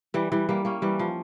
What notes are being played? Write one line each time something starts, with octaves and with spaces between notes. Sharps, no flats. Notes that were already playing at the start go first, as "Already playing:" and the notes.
E3 G3
E3 G3
G3 A#3
A#3 C#4
E3 G3
F3